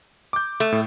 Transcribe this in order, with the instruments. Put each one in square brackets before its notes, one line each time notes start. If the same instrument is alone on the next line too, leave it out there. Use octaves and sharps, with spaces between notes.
[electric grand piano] D6 G6
[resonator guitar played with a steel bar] A3
[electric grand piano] A2